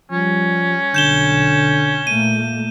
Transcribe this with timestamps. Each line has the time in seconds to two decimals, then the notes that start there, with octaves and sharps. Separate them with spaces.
0.11 F3 G3 C#4
0.94 B1 D3 G6 E7 G7
2.07 A#2 A3 A#3 D#7